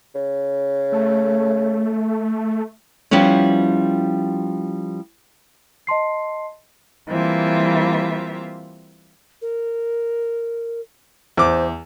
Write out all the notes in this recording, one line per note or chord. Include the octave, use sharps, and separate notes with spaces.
C#3
A3
F3 G3 B3 C#4 E4
D#5 A5 C6 C7
E3 G3 A#3 C4 F4 E5
A#4
E2 C5 D6